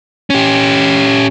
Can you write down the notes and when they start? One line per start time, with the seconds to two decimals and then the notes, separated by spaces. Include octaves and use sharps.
0.30 C#4 G4